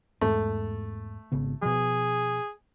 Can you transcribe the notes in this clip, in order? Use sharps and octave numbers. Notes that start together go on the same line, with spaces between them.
E2 G#2 A3
G#1 C#3 B3
B2 F3 G#4